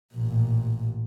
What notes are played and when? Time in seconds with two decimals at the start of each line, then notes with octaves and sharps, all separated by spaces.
0.14 A1 A#2